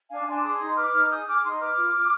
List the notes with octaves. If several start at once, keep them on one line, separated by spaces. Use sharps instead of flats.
D4 F5 G#5
D4 G#5 C6
G#4 C6 D#6
D#4
B4 D6 F6
D#4
G#4 D#6 G6
G#4 D6 F6
D#4 C6 D#6
B4 D6 F6
F4
F4